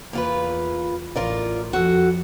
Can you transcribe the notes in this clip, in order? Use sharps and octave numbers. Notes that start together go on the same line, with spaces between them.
E2 A#3 F4 B4
A1 F4 A#4 D5
F2 F#4 A4